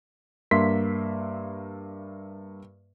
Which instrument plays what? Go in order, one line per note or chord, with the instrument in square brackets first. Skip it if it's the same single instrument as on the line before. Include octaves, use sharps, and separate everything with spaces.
[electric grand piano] G2 A#3 E5 C6 B6